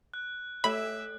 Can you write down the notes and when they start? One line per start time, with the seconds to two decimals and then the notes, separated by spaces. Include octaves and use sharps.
0.14 F#6
0.64 A3 A4 C#5 E5 B5